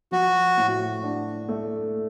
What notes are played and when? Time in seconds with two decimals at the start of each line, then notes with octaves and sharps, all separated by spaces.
0.12 F3 F#4
0.57 A2
1.03 D4
1.49 A3